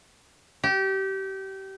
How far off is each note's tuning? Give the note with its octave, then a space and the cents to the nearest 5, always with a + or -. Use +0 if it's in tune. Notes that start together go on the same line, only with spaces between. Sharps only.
G4 -25